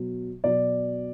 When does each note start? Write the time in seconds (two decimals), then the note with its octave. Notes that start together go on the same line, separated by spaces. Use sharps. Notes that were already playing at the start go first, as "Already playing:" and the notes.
Already playing: B2 F#3
0.44 B2 F#3 D5